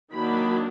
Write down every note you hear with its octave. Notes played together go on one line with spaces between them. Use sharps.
D#3 F#3 A#3 D4 B5